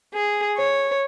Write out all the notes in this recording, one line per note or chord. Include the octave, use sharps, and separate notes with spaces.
G#4
C#5